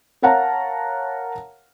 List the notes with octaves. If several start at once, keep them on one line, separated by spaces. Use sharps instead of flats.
A#4 C#5 F5 F#5 A5 A#5